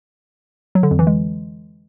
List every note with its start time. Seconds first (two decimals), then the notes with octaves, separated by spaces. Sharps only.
0.75 F#3
0.83 D3
0.91 F2
0.99 E3
1.07 G#3